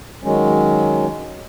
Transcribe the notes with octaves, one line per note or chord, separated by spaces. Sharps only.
D#3 F#3 G#3 C#4